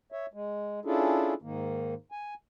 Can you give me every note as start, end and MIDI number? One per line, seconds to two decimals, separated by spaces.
0.12 0.26 73
0.12 0.26 76
0.33 0.80 56
0.85 1.34 61
0.85 1.34 62
0.85 1.34 64
0.85 1.34 65
0.85 1.34 68
0.85 1.34 69
1.42 1.94 44
1.42 1.94 51
1.42 1.94 58
2.12 2.34 80